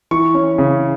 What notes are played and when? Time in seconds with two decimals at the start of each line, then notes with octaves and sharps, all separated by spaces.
0.11 E3 C#6
0.34 C#4
0.58 C#3